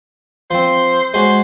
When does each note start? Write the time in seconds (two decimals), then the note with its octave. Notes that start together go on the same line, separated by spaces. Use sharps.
0.51 F3 C4 C5
1.14 G#3 F#4 C5 C#5